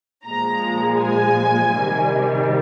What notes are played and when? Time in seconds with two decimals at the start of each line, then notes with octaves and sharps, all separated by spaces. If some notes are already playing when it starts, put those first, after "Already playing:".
0.25 A#2 F3 G#3 A#5
1.00 G#5
1.75 C3 D#3 G3